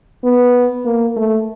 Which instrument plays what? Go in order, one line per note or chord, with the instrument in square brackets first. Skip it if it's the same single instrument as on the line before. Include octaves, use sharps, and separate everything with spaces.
[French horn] B3
A#3
A3